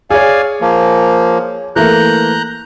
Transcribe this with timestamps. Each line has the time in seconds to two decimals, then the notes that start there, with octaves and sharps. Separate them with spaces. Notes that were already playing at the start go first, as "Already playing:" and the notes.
0.11 G#4 C#5 D5 F5 G#5
0.61 F3 A#3
1.76 E3 A3 A#3 A#5 F#6 G6